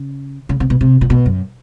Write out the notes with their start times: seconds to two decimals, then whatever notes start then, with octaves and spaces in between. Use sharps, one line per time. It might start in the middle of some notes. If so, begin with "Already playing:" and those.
Already playing: C#3
0.49 C#3
0.60 C3
0.70 B2
0.81 C3
1.01 A#2
1.10 B2
1.26 F#2